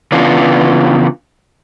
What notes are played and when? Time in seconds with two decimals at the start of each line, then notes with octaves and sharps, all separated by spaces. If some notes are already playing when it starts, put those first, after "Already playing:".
0.12 C#3 E3 B3 D4 F4